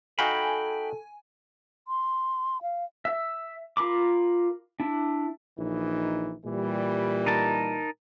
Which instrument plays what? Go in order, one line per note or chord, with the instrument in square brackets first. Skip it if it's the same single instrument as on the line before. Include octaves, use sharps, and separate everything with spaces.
[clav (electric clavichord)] D#4 F#4 F5 [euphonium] A4 [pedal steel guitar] G5 B5 [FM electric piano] G#5
[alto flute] C6
F5
[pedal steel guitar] E5
F4 A#4 B5 D6
D4 E4
[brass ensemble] A#1 E3 D#4
A#2 E3 G3
[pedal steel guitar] D#4 A#4 A5